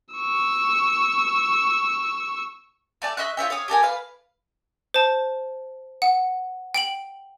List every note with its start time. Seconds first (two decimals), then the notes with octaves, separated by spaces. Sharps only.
0.14 C#6 E6
3.02 A3 D5 A5
3.17 D#5 E5 C#6 F#6
3.37 F4 C#5 E5 G5
3.50 C#5 F5 D#6
3.68 G4 A4 A#4 G#5
3.83 B4 F5
4.94 C5 A5
6.02 F#5
6.74 G5 D7 F#7